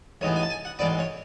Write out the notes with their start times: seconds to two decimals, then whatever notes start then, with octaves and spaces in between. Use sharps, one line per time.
0.21 A1 G#2 E3 B3 C#5
0.36 G#5
0.43 A5
0.50 G#5
0.65 F#5
0.79 A1 G#2 E3 B3 D5
0.99 C#5